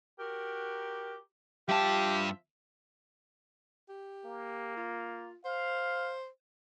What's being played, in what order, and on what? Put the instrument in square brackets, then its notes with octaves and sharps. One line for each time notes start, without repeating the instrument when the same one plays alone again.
[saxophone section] F#4 G4 A#4
[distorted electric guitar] G2 A5 [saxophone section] F3 F4 E5 [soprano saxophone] G4
[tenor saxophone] G4
[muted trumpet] A#3
[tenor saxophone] F4
[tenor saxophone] C5 [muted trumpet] F5